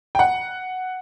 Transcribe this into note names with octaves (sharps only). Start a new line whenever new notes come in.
G5
F#5